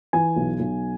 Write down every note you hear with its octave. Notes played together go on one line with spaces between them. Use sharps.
E3 G#5
B1
B1